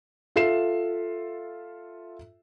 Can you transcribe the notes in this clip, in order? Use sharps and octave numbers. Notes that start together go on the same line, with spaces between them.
F4 A4 E5 C7 E7